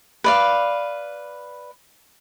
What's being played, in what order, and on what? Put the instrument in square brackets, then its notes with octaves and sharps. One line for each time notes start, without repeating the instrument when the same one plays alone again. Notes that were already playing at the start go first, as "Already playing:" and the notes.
[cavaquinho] B4 D5 F5